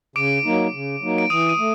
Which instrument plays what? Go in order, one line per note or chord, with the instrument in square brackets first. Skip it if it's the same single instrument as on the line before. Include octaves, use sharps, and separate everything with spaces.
[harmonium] C#3 [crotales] D6 D7
[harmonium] F#3 A#3 D#4
C#3
F#3 A#3 D#4
[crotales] D7
[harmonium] E3 [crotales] D#6 D#7
[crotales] D#6 D#7
[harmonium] A3